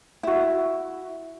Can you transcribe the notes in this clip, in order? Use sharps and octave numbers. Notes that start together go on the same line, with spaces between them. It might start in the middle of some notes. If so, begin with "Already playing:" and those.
E4 F#4